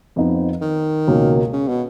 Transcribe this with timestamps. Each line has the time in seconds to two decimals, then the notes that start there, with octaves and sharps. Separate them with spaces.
0.16 F2 F3 B3 D#4
0.61 D#3
1.07 C#2 B2 A#3 C#4
1.53 C#3
1.68 B2